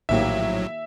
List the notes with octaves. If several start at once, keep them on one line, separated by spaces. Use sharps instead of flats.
A#1 A2 D#3 F#3 A#3 G4 E5